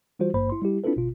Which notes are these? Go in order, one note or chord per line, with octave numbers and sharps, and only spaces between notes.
E3 G3 F4 F#4 C5
G#1 G2 A#3 C5 B5
E4 C6
G3 E4 G4
C4 D4 E4 F4 A4 B4
G1 B2 F4